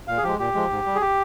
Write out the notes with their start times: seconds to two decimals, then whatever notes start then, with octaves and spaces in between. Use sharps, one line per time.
0.08 A#2 F5
0.17 G#4
0.23 F3 G#3 G4
0.39 A#2 G4
0.54 F3 G#3
0.70 G#2
0.86 G3
0.95 G#4
1.01 G4